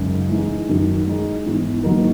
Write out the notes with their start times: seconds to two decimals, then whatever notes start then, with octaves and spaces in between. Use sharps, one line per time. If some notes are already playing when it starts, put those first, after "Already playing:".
Already playing: F#2 C#3 G#3 D#4
0.30 E3 G#3 D#4
0.69 F#2 D#3 F#3
1.07 G#3 D#4 G#4
1.46 G#2 E3 B3 E4
1.83 G#2 F#3 A#3 D#4 A#4